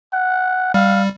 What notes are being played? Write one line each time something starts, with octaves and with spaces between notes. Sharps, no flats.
F#5
G3 F5